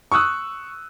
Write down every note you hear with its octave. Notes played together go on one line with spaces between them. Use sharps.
C#6 D#6 E6 F#6